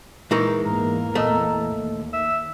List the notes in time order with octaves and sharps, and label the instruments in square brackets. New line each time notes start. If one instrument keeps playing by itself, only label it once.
[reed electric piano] A#2 A#4 C#6 [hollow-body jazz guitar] E3 G#3 D#4
[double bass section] E2 A#3 [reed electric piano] G#2 [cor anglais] A#4
[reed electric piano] A#2 D#5 E6 [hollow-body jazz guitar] A3
[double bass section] D#2
[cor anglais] E5